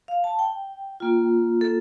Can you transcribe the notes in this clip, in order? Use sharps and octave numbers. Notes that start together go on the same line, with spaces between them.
F5
A5
G5
A#3 F4
A4